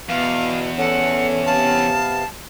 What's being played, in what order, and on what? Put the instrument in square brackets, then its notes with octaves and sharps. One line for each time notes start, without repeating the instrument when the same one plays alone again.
[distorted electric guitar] E2 [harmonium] B2 [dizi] F5
[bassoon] C#4 [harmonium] A4 [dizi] F#5
[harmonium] C3 B3 F5 [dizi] A5